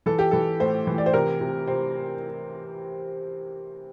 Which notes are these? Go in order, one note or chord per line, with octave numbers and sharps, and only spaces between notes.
E3 A4
G4
E3 A4
A2 C5
E3
D5
C5
C3 A#4
C3
C3 C4